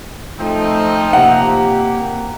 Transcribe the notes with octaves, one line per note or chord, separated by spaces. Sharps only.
F3 A3 C4 D#4
C3 A#3 G4 F#5 A#5